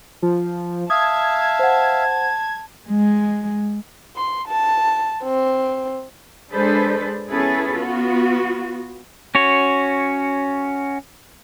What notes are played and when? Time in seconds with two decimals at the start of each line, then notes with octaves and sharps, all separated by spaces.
0.22 F3
0.90 E5 F5 A5 D#6 G#6
1.59 C5 F#5
2.88 G#3
4.16 C6
4.48 A5
5.24 C4
6.52 G#3 D4 G#4 A4 B4 C5
7.30 B3 C#4 E4 G#4 A4 B4
7.78 B3 F4 F#4
9.35 C#4 F#4 C#5